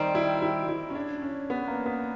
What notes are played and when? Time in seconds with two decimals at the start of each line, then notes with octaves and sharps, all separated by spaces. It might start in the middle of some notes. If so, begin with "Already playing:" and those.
Already playing: D#3 G3 C4 D#4
0.15 E4
0.42 E4
0.68 E4
0.90 C#4
0.95 D4
1.22 C#4
1.50 B3
1.68 A#3
1.86 B3